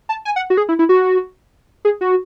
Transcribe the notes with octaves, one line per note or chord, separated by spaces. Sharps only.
A5
G#5
F#5
F#4
G#4
E4
E4
F#4
G#4
F#4